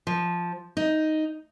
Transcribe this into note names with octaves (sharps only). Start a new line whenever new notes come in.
F3
D#4